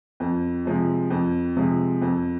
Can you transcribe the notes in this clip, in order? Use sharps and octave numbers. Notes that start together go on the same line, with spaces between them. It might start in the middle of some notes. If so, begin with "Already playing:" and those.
F2
C3 F3 G#3
F2
C3 F3 G#3
F2